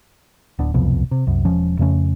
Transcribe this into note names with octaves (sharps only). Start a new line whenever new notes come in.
D1 B3 D4
D1 C2 F2 B2
C3
C2 F#2
E1 F3 C#4
F2 C#3 A3 C#4